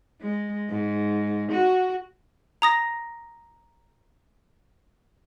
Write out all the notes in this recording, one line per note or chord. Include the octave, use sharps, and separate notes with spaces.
G#3
G#2
F#4
A#5 D#6 A#6